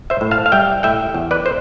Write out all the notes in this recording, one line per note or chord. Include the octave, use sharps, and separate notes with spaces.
C5 E5
A2
F5 A5
F5
G3 E5 G5
A2 E5 G5
E2
B4 D5
C5